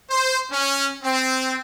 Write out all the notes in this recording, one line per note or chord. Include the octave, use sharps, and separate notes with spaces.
C5
C#4
C4